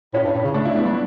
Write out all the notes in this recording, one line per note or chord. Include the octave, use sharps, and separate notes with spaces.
A2 C#4
G2
A2
C#3
A3 D4
E4
A3 B3
G3 D4